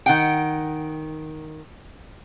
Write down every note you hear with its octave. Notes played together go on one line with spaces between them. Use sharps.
D#3 F#5 G5